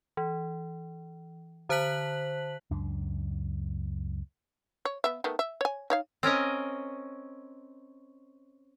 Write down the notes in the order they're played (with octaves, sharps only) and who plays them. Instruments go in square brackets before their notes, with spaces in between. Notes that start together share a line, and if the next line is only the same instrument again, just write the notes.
[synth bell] E3
D3 C5 A5 F#6 B6 F#7
[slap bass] C#2 F#2 D4
[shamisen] C#5
B3 E5
D#3 A3 B3
E5
C#5 G#5
D#4 C#5 F5
[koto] C4 C#4 A#4 D#5